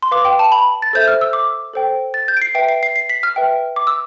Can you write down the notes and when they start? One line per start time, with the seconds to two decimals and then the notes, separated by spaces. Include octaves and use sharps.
0.02 C6
0.11 B4 F5 D6
0.25 G5
0.39 A5
0.52 B5
0.82 A6
0.93 A4 C5 E5 G6
1.08 F6
1.21 E6
1.33 D6
1.74 A4 C5 G5
2.14 A6
2.28 G6
2.37 D7
2.41 C7
2.55 B4 E5 G5 D7
2.68 C7
2.83 C7
2.96 C7
3.09 B6
3.23 F6
3.36 B4 E5 G5
3.76 D6
3.87 E6